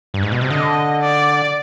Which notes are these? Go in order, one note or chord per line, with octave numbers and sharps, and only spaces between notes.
G2
G#2
B2
C3
D3 D#5
D5